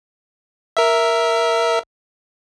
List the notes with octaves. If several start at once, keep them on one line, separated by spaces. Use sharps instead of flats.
A#4 E5